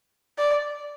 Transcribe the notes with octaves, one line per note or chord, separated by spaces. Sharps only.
D5